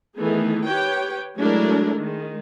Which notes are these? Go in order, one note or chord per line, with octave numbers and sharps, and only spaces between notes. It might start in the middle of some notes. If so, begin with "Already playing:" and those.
D#3 E3 A3 B3 G#4
G4 B4 C#5 G5
F#3 G#3 A3 D4 E4 A#4
D#3 G#3